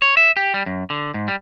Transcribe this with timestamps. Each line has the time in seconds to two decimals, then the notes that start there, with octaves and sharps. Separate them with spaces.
0.02 C#5
0.17 E5
0.37 G4
0.54 G3
0.66 F#2
0.90 D3
1.14 G#2
1.28 G3